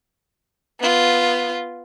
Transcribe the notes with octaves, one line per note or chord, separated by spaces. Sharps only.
B3 F4